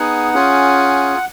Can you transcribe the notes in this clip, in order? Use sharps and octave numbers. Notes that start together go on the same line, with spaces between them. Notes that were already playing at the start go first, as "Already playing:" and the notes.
Already playing: B3 D#4 G#4 F#5
C#4 F4 G#4